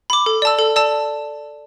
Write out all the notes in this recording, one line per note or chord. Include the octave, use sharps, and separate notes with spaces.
B5 D6
A4
D5 A5 E6
A4
D5 A5 E6